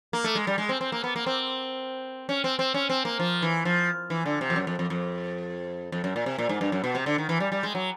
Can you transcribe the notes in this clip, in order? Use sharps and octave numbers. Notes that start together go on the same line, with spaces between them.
A#3
A3
G#3
G3
G#3
C4
C4
A#3
B3
A#3
C4
C#4
C4
C4
C#4
C4
A#3
F3
E3
F3
E3
D3
C3
F2
F#2
F2
F2
F2
F2
F#2
A#2
C3
A#2
G#2
G2
F#2
B2
C3
D3
D#3
E3
G3
G3
G#3
F#3